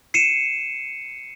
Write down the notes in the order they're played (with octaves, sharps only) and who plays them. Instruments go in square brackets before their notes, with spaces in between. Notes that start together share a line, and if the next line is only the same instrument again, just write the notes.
[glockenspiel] C7 C#7 D#7 E7